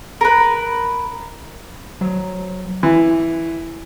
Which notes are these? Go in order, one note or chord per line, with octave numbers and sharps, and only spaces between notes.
A#4 B4
F#3 C5 C#5 A#5
E3